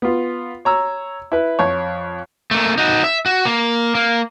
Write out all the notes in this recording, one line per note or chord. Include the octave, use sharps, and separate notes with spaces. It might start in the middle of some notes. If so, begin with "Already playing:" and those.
B3 F4
C#5 A#5 E6
E4 B4
F2 C#5
A3 A#3
D#4 F#4
E5
F#4
A#3
A#3